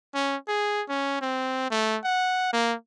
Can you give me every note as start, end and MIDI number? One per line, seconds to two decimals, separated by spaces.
0.14 0.36 61
0.48 0.82 68
0.89 1.19 61
1.21 1.70 60
1.70 1.98 57
2.04 2.53 78
2.53 2.74 58